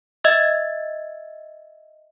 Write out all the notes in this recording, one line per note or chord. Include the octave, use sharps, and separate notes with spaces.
D#5 E5 E6 G#6 A6